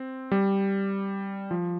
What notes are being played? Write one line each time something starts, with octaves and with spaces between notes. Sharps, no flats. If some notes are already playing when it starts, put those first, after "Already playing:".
Already playing: C4
G3
F3